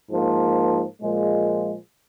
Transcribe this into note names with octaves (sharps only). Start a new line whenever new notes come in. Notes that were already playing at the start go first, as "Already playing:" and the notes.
G#2 F3 A#3
A#2 F3 G#3